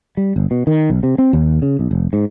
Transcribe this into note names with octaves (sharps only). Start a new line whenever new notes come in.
G3
G1
B2
D#3
B1
C3
C4
D#2
C#3
B1
F1
G#2